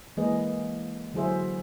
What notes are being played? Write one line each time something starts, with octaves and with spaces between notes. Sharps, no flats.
E3 G#3 A#3 G#4 B4 D#5
D3 F#3 E4 G#4 C5 E5